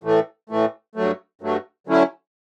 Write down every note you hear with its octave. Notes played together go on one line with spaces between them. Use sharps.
A2 E3 A3
A2 E3 A3
G2 F#3 A3
G2 F#3 A3
D3 F#3 A3 C#4 E4